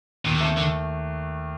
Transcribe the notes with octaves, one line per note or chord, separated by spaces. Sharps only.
D#2 A#2
D3
C3 A3
D#2 D3